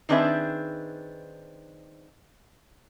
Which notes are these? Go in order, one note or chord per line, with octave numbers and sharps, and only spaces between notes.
D#3 C4 D4 G#4 B4 E5